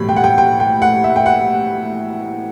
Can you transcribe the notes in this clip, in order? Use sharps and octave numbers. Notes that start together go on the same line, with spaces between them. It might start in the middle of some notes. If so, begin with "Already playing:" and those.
Already playing: B1 A2 E3 G3 B5
G5
F#5
G5
G5
G5
F#5
E5
G5
F#5